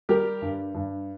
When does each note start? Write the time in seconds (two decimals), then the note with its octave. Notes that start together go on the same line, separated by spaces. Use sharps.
0.09 G3 G4 A#4
0.42 G2
0.74 G2